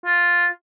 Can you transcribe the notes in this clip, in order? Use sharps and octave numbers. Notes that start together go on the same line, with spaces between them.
F4